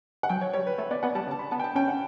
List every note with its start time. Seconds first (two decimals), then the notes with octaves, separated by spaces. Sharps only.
0.23 F#5
0.29 F#3 G5
0.41 C#5
0.53 G3 C#5
0.67 B4
0.78 A3 C#5
0.91 B3 D5
1.03 B3 F#5
1.15 G3 A5
1.27 C#3
1.31 A5
1.39 B5
1.51 B3 A5
1.60 G5
1.64 A5
1.75 C#4 G5
1.88 F#5